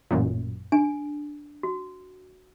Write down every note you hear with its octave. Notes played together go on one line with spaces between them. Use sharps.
A1 F#2 A#2
D4 D7
F#4